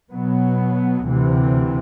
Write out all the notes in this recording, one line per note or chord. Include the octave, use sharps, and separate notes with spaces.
B2 F#3 B3
D2 C3 E3